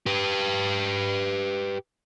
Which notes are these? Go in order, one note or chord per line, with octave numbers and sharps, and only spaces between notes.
G4 B4